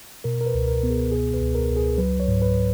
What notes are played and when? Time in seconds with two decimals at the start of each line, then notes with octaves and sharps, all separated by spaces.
0.24 B2 A#4
0.41 A#4
0.46 B4
0.54 C#2
0.68 A#4
0.83 B3
0.90 G#4
1.12 B2 G#4
1.34 B4
1.41 C#2
1.55 A#4
1.70 C#2
1.77 G#4
1.98 F#3 B4
2.20 C#5
2.28 G#2
2.42 B4